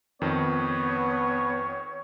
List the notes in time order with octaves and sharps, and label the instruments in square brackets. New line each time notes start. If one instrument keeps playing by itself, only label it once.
[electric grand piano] F2 D#3 [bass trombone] B3 [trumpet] C#5